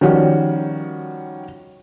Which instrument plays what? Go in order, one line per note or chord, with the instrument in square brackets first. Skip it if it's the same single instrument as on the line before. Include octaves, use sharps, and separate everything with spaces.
[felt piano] D#3 F3 G3 C#4 F#4